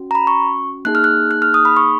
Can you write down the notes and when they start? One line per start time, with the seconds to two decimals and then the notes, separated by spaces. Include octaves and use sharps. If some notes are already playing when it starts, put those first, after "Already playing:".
Already playing: C#4 F#4
0.11 A#5
0.15 B5
0.27 C#6
0.85 A#3 D#4 G#4 F#6
0.95 F6
1.04 F#6
1.31 F#6
1.42 F6
1.54 D#6
1.65 B5
1.77 C#6